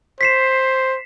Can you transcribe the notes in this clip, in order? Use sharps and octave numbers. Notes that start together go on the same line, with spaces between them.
C5 B6 C7 E7